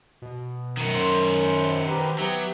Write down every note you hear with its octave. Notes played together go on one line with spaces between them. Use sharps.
B2
F#2 D#3 F#4
C5
G4 A#4 B4
F#3 B3 G4 E5